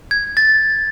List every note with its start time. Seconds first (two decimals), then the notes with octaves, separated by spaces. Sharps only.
0.11 G#6
0.37 A6